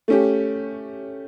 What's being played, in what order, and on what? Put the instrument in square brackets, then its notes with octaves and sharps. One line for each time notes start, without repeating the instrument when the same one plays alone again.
[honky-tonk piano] A3 C#4 G4